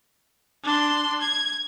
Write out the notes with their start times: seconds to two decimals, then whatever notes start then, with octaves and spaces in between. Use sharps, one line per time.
0.63 D4 C6
1.21 G#6